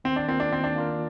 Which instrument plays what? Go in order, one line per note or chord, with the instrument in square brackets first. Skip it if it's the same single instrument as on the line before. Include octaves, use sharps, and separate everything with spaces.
[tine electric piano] D#3 [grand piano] C4
[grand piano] D4
[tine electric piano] A#3 F4 A#4 [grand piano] C4
[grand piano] D4
[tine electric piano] D#3 [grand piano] C4
[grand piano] D4
[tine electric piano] A#3 F4 A#4